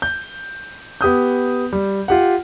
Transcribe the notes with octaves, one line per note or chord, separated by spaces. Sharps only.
G6
B3 G4 D#6 G6
G3
F4 G4 F#5